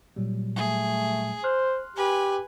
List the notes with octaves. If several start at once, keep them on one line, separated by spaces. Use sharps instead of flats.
A#2 F#3 G3
A3 G#4
C5 C6 F6 F#6
G4 B4 G#5